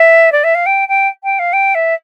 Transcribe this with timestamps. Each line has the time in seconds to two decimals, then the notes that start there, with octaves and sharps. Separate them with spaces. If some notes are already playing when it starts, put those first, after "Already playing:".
Already playing: E5
0.32 D5
0.44 E5
0.55 F5
0.66 G5
0.88 G5
1.23 G5
1.39 F5
1.53 G5
1.74 E5